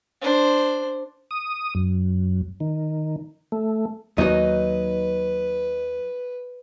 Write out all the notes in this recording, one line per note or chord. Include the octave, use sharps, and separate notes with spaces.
D4 C5
D#6
F#2
D#3
A3
D#2 F#3 D#4 B4 D#5